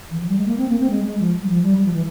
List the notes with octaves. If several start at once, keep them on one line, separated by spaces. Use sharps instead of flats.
E3
F3
G3
G#3
A#3
C4
A#3
C4
G#3
G#3
F3
G3
F3
G3
G3
F3
E3